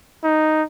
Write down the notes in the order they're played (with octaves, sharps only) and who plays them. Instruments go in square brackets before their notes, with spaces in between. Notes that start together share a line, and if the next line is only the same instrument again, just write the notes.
[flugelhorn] D#4